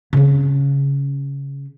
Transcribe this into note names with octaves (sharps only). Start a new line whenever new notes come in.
C#3 C#4